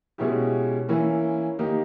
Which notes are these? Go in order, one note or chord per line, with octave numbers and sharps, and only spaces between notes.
B2 G#3 C#4 E4 G4
E3 A#3 C#4 E4
D#3 A#3 D#4 G4